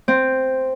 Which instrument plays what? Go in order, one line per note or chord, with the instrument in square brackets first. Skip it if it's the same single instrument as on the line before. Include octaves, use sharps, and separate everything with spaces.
[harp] C4